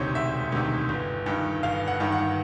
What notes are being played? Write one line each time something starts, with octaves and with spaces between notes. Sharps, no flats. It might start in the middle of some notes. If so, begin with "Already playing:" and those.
Already playing: E1 D2 C3 D#3 C5 C#5
E1 E5
D2 C3 D#3
G1
G2 D#3
G1 F5
F#5
G2 D#3
F#5